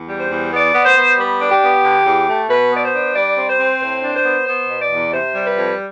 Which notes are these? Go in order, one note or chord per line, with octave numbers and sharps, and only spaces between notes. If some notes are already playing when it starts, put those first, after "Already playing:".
Already playing: E2
G3
C5
E2
B3 D5
B3
C5
B3
G3 B4
D4
G4
B3
D3
E2
A3
B2 B4
B3 D5
C5
D4
G3 D5
C4
C5
C4
A2 C5
D4
C5
B3
B3 C5
B2
D5
E2
C3 C5
G3
B4
F2